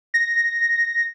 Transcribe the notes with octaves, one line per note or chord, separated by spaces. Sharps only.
A#6